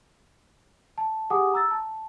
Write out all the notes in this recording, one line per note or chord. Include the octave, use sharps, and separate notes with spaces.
A5
G4 G#4 F#5 G#5 D6 D#6
A#5 E6 A6
A5